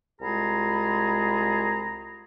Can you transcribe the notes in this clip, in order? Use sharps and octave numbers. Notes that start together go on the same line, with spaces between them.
C2 G#3 F4 G#4 A#5 B5